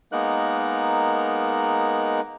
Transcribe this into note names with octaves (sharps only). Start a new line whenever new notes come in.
G#3 A#3 B3 D#4 A#4 F#6